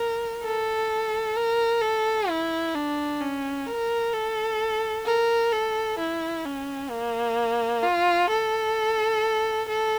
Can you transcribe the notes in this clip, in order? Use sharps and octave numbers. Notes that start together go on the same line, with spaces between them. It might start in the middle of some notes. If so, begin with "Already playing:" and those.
Already playing: A#4
A4
A#4
A4
E4
D4
C#4
A#4
A4
A#4
A4
E4
C#4
A#3
F4
A4
A4